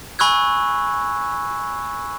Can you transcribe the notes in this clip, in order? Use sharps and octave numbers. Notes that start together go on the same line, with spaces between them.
G#5 B5 C#6 E6 F#6 G#6